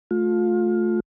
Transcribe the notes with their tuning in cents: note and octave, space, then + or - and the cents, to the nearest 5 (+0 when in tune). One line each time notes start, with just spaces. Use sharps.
A3 -15 F4 +25